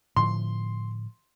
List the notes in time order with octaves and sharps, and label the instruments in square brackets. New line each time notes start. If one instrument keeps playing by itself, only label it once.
[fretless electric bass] A2 D3 F3 [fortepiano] C6